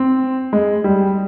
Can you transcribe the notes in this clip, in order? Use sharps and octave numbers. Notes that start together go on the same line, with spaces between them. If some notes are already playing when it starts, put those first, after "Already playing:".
Already playing: C4
G#3
G3